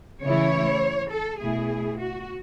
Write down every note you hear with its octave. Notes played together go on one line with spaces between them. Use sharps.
C#3 E3 A3 E4 C#5
A4
B2 A3 E4 G#4
F#4